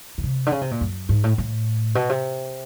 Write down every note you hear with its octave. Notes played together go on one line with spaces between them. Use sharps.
C#3
C3
D3
C#3
C3
A#2
F#2
G#2
A2
A2
B2
C3